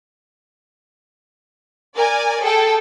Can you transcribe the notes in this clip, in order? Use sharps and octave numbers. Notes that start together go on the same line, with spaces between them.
A#4 D5 G#5
G#4 A4 G5